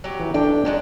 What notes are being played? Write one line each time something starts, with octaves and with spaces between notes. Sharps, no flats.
F#3 G4
E3
D4 A4 G5
F#3 G#3 D4